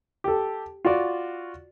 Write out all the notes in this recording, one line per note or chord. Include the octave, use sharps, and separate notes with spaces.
G4 A4
F4 F#4 D5